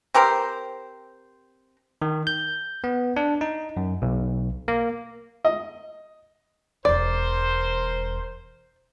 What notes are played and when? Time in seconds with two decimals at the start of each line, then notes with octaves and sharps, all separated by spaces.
0.14 C4 G4 A#4 C5
2.02 D#3
2.27 G6
2.84 B3
3.16 D4
3.41 D#4
3.77 F#2
4.02 B1
4.68 A#3
5.45 D#5
6.85 E1 E2 A#4 C5 D5